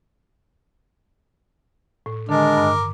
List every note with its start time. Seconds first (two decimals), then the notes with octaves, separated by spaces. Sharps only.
2.06 A2
2.29 D3 D#3 G#3 D4 A#4 D6
2.57 G2